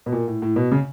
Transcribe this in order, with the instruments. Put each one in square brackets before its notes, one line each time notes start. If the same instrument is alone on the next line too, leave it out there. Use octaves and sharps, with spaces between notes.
[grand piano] B2
A#2
A2
A2
B2
C#3